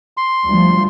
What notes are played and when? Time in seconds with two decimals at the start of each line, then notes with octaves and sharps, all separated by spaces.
0.17 C6
0.48 D2 F3 G3